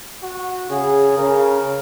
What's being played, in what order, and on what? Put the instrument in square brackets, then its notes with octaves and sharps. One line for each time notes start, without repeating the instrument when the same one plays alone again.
[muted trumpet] F#4
[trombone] C#3 [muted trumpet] G#4
[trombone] C#3 [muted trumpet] A#4